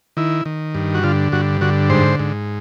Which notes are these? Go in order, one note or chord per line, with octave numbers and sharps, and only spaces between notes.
D#3 E4
D#3
G2
F#4
D3 F4
G2 F#4
D3 F#4
G#2 C5
G#2